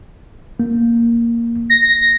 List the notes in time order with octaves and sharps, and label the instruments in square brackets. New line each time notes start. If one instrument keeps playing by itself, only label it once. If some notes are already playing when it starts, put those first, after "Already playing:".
[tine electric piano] A#3
[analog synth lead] A#6